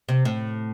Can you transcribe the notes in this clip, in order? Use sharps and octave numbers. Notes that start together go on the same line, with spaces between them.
C3
A2